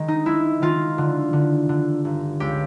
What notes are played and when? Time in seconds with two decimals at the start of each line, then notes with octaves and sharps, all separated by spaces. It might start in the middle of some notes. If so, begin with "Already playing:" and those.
Already playing: D#3 G#3
0.08 D#4
0.26 G#3 E4
0.62 D#3 F4
0.98 D3
1.33 D3
1.69 D3
2.05 G1
2.40 C#2 G4